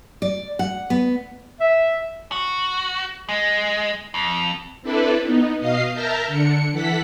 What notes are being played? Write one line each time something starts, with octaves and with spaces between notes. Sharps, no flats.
D5
F#5
B3
E5
F#4
G#3
F2
C4 D4 E4 A4 B4 D5
B3 D#4
B2 D#5 F5 C7
A#4 E5 A5 A#5 F6 G6
D3 D4 C#7
E3 A4 F#5 B6